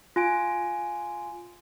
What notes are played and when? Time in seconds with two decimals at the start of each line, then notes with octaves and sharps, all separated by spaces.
0.16 F4 G#5 D7